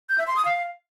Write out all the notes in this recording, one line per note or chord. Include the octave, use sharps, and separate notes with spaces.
G6
E5
C6
D#6
F5